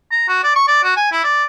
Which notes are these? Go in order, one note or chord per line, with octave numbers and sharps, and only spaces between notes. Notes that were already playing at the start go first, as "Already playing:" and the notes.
A#5
F#4
D5
C#6
D5
F#4
G#5
E4
D5